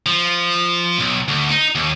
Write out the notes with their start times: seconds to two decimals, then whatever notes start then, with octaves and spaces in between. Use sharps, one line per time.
0.06 F3
0.99 B1
1.28 D2
1.51 D#4
1.75 D#2